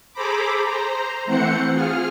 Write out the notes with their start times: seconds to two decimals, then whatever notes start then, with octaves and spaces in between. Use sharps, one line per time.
0.13 G#4 A4 C5 A#5 B5 D6
0.64 C5 A#5
1.25 E3 A3 C4 C5 F#5 C#7
1.71 F4 G#4 F6